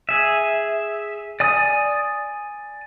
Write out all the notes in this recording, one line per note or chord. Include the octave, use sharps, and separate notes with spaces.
G#4 E5
D5 G#5 D#6